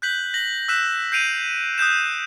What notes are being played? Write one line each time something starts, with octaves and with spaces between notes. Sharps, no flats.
F#6 G6 B6 F#7
A#6 F#7
E6 F#6 B6 E7
G6 C7 D7 D#7 F7
D#6 F#6 G6 E7